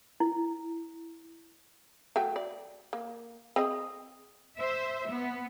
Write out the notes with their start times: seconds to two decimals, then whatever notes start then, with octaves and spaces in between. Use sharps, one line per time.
0.20 E4
2.16 F#3 A3 G5
2.36 D5
2.93 A#3
3.56 C4 G#4 D#5
4.57 C5 E5
5.11 B3